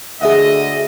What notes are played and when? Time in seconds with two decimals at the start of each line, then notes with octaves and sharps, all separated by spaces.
0.21 D2 G#4 D#5 E5 F#5